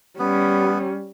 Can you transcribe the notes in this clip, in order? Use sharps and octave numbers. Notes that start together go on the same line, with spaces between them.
G3 B3 C#4